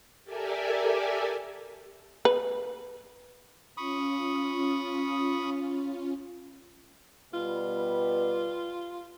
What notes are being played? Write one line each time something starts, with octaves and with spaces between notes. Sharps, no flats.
G4 A4 A#4 D5 E5 G#5
B4
C#4 F4 B5 C#6 D#6
B2 G3 F4 B4